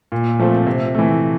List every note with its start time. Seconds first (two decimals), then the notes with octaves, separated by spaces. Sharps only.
0.12 A#2
0.39 F3 A3 C4
0.67 C3
0.94 E3 A3